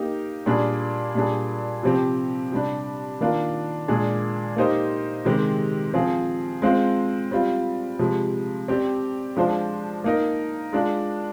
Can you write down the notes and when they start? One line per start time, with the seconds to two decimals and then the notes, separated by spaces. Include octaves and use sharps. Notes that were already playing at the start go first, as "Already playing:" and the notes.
Already playing: A#3 D#4 G4
0.46 A#2 G3 D4 G#4
1.15 A#2 G3 D4 G#4
1.83 C3 F3 C4 G4
2.52 C3 G3 D4
3.20 D#3 A#3 D4 F4
3.88 A#2 G#3 D4 G#4
4.56 A#3 D#4 G4 C5 D#5
5.25 C3 D#3 G#3 C4 G4
5.94 F3 C4 F4 G#4
6.62 G#3 C4 F4 C5
7.31 G3 C4 F4
7.99 C3 F3 G#3
8.68 C4 G4 D5
9.36 F3 G#3 D4 F4 C5
10.04 A#3 D#4 A#4
10.73 G#3 D4 F4